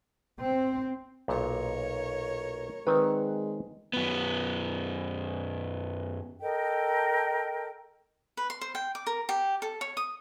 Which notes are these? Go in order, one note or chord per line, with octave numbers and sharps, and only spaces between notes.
C4
B1 A#2 A#4 C#5
D#3 G#3 C4 B4 D5
F#2 B3
A4 A#4 D#5 G5
B4
C6
C5
G5
D6
A#4
G4
A4
C#5
D#6